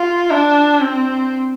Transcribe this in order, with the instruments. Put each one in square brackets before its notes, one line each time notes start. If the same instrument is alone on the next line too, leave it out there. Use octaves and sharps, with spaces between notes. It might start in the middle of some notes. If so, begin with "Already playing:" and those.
Already playing: [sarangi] F4
D4
C4